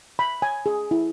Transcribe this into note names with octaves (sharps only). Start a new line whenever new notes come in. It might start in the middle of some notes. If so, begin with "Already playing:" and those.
B5
G#5
G#4
E4